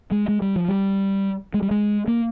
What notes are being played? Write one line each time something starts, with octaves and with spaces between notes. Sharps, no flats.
G#3
G#3
G3
F3
G3
G#3
G3
G#3
A#3